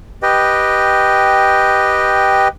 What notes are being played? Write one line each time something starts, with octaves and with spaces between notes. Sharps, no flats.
G4 B4 D#5 G5